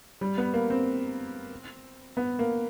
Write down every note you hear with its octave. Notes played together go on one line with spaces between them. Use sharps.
G3
B3
A#3
C4
B3
A#3